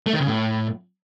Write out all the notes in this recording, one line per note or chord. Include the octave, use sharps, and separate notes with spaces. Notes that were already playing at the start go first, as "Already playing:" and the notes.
A3
D#3
C#3
A2